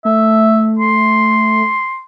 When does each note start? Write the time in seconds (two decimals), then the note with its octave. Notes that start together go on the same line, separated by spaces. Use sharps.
0.05 A3 E5
0.79 C6